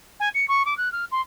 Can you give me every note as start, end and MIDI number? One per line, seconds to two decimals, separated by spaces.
0.20 0.29 80
0.34 0.45 97
0.48 0.65 85
0.65 0.76 86
0.77 0.91 90
0.92 1.05 89
1.11 1.21 84